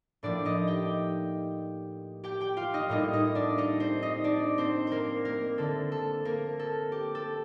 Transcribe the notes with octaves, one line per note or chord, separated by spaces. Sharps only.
A2 F3 A#3 D4 D5
D#4 D#5
G4 G5
G4 G5
G4 G5
F4 F5
D#4 D#5
A2 G3 A#3 D#4 D#5
D#4 D#5
D4 D5
D#4 D#5
C4 C5
D#4 D#5
D4 D5
C4 C5
A#3 A#4 C5
A#3 A#4
D3 A3 A4
A4
A#3 A#4
A4
G4
A4